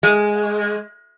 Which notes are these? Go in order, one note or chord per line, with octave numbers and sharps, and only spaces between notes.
G#3